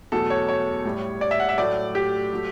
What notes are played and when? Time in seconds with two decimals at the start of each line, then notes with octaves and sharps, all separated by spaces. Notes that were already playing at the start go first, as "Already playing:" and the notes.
0.12 E2 B2 F#3 A3 A4
0.30 C#5
0.48 C#5
0.85 A2 G3
1.21 D5
1.31 E5
1.40 F#5
1.49 E5
1.58 A2 F#3 A3 D5
1.95 G4
2.33 F#3 A3